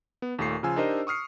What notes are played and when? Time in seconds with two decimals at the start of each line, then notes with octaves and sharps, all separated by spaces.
0.22 B3
0.39 D#2 A#2 A3 C#6 C7
0.63 C#3 F3 F4 G#5 E6
0.76 D4 D#4 G4 A#4 C5 D#5
1.07 C#6 D#6 F6 C7 C#7